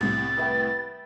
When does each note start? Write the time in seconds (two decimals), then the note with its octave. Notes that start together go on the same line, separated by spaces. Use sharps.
0.01 C2 A2 C3 A6
0.37 B4 E5 G5